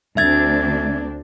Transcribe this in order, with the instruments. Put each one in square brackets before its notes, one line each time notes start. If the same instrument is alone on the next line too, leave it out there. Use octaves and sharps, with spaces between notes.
[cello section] D2 C4 D4 [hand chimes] E5 G#6 A6